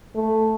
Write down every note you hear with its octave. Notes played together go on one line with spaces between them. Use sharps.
A3